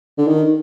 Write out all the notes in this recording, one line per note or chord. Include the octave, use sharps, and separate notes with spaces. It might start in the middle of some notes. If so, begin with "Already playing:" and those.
D3
D#3